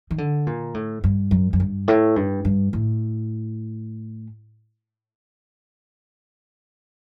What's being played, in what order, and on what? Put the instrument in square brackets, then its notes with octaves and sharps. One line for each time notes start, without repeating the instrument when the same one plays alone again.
[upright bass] D#3
D3
A#2
A2
G2
F#2
F#2
G2
A2
G2
G2
A2